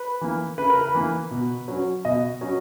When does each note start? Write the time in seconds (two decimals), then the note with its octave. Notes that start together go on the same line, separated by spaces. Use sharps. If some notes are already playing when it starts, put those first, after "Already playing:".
Already playing: B4
0.21 E3 A#3
0.58 C#3 B4
0.70 A#4
0.81 B4
0.95 E3 A#3
1.31 B2
1.68 F#3 C#4
2.05 B2 D#5
2.41 F#3 C#4